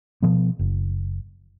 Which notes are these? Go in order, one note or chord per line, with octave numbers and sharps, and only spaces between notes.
B2 F3 B3
F#1